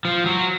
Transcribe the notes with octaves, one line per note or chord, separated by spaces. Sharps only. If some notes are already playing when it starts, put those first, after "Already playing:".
F3
F#3